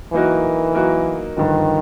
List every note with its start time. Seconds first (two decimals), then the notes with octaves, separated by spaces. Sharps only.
0.13 E3 F#3 A#3 D#4 F#4 A#4
0.75 F#3 A#3 D#4 F#4 A#4
1.37 G2 D3 D#3 F3